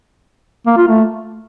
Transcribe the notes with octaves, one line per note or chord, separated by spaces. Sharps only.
A#3
F4
A3